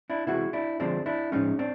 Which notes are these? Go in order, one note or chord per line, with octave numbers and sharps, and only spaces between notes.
D4 E4
C3 E3 G#3 E4 F#4
D4 E4
D3 F3 G#3 C4 D4
D4 E4
A2 F3 G#3 C#4 D#4
C4 D4